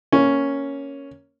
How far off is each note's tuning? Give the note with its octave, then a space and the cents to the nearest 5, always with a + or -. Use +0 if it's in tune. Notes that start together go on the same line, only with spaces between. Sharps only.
A#3 +0 C#4 +0